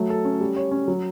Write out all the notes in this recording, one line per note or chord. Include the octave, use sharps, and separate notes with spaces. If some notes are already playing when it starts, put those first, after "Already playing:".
Already playing: F#3 A3
A4
C#4
G3
C#5
C#4
F#3